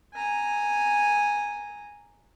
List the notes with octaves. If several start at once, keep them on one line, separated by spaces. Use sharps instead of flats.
G#5 A#5